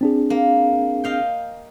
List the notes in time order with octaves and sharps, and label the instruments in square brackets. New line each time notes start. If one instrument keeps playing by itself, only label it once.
[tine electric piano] C4 D4 G#4
[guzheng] A#3
D#5 F5 G5